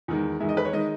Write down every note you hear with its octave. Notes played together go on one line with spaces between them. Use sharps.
E2 D#3 G#3
E2 D#3 G#3 E5
D#5
B4
C#5
D#3 G#3 D#5